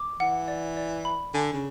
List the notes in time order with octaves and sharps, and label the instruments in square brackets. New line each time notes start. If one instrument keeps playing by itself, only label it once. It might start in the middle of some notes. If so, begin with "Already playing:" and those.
Already playing: [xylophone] D6
[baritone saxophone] E3 [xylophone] F#5
[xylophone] D5
D5
B5
[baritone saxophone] D3 [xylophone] G#5
[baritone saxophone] C#3